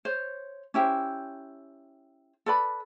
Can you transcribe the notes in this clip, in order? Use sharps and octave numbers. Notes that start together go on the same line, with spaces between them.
C5 C#5
C#4 E4 G4 C5
A4 B4 D5 B5